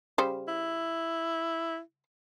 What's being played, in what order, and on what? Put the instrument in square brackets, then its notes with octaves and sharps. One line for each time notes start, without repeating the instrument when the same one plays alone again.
[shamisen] C#3 G3 C5
[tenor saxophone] E4